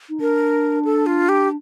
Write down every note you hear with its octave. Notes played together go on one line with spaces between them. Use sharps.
D#4
D4 A#4
A4
F4
G4